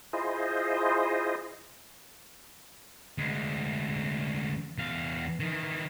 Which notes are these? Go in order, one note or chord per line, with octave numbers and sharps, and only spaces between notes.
E4 F4 G#4 C5 D#5
D2 G#3
E2 F5
D#3 E3